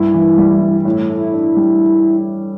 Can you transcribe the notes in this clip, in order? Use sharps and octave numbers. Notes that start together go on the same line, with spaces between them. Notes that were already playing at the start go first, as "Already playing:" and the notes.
Already playing: G2 E4
E3
G3
G2
A2 E4
E4
A4
E4
D4
G3